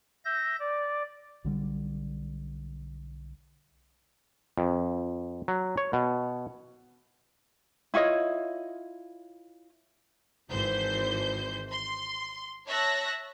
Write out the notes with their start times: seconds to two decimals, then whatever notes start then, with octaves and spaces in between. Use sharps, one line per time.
0.25 E5 G6 A#6
0.60 D5
1.44 B1 D3 G3
4.58 F2
5.48 F#3
5.77 C#5
5.93 B2
7.94 E4 F4 C#5 D#5
10.50 G#1 E3 C5 G6
11.71 C6
12.67 C#5 E5 A5 F#6 A#6